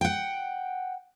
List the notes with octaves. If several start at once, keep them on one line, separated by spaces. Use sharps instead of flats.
F#5 G5